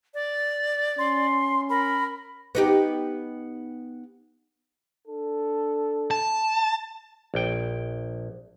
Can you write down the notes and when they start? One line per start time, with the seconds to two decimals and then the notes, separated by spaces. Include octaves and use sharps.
0.14 D5
0.98 C#4 C6
1.69 A#4 B5
2.55 B3 D#4 G4
5.06 D4 A4
6.11 A5
7.34 A#1 G5